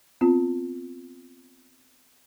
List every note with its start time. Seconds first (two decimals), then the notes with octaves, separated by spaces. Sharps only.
0.21 B3 C4 F4